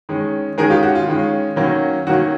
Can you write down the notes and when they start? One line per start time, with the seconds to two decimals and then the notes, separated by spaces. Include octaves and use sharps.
0.09 D#3 G#3 C#4
0.58 D#3 G#3 C#4 G#4 A#4
0.70 F4 G4
0.83 F#4
0.95 F4
1.08 D#3 G#3 C#4
1.56 D#3 F#3 A#3 C#4
2.07 D#3 F#3 A#3 C#4 F#4